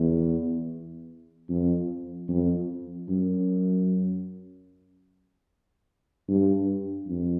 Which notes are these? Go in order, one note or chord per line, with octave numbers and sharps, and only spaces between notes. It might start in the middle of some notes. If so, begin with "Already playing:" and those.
Already playing: E2
F2
F2
F#2
G2
F2